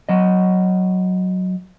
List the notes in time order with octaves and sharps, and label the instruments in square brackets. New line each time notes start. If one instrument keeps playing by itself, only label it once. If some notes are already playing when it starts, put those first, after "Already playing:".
[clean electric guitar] F#3 D#5